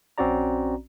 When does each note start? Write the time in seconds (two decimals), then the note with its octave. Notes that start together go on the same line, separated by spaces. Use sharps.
0.18 A#1 C4 C#4 F#4 D5 A#5